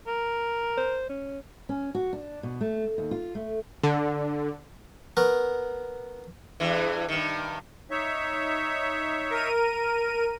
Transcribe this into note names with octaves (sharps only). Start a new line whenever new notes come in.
A#4
C5
C#4
C#4
F#4
D4
B2
A3
D#2
F4
A3
D3
B3 A#4 C#6
E2 G2 E3
G2 D#3
D#4 C#5 E5
A#4 D#7